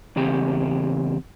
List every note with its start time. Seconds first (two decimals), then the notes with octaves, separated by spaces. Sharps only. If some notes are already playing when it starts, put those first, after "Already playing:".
0.16 E2 C#3 C4 G4